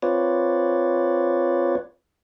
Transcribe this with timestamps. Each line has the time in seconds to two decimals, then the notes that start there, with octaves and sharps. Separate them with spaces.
0.02 C4 F4 B4 C#5 D5